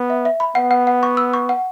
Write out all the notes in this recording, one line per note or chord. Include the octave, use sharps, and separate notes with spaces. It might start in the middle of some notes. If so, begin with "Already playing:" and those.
Already playing: B3
E5
E5
B5
B3 F#5
F#5
F#5
C#6
E6
C#6
F#5